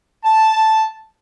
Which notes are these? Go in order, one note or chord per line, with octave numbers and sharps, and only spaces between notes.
A5